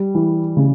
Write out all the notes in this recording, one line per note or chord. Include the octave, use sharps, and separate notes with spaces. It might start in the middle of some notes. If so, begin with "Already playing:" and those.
Already playing: G3
E3
C#3